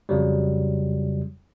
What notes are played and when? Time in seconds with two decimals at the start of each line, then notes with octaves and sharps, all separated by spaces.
0.09 F2 C#3 F#3 G3